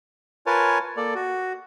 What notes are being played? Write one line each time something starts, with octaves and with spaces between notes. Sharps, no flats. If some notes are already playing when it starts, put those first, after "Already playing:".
F4 A#4 B4 C#5 G#5 A5
A#3 A4 D5
F#4